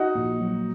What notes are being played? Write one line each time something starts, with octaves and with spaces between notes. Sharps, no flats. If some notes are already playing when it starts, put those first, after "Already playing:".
Already playing: D#4 F#4
A#1
F#3